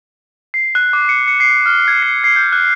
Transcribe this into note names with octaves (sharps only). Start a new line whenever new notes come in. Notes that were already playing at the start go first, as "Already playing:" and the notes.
C7
F#6
D6
C#7
C#7
C7
F6
G#6
C7
C7
G6
F#6